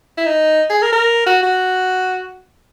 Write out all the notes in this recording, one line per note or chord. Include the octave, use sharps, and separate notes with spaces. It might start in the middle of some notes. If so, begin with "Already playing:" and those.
E4
D#4
G#4
A#4
A#4
F#4
F#4